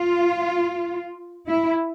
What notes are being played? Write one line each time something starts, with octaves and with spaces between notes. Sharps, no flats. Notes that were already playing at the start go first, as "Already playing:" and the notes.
Already playing: F4
E4